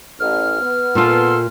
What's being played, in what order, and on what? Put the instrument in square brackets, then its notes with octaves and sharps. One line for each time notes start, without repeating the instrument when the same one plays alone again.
[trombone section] A1 [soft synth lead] F6
[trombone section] B3
[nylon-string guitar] A#2 F4 [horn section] A4 C6